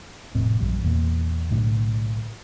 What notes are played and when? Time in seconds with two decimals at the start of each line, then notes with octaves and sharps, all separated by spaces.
0.35 F1 A2 C4
0.60 A#1 F#2 G3
0.84 E2 A#2
1.51 B1 A2 D3